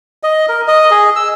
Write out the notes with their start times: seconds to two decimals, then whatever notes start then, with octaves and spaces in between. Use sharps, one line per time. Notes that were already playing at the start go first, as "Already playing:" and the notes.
0.23 D#5
0.49 A#4
0.68 D#5
0.91 G#4
1.16 E6